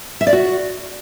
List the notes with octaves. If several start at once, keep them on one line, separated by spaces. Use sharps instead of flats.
E5
D5
F#4